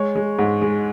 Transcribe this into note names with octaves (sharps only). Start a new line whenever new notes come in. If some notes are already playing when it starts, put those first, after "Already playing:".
Already playing: G#3 C#5
G#3
G#2
G#3